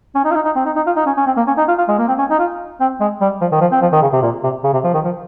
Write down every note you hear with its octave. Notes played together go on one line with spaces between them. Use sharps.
C#4
D#4
F4
D#4
D#4
C4
D#4
D#4
F4
D#4
C#4
C#4
C4
A#3
C#4
D#4
F4
F4
G#3
A#3
C4
C#4
D#4
F4
C4
G#3
G3
F3
D#3
F3
C4
F3
D#3
C#3
C3
A#2
C3
C#3
C3
F3
D#3
F3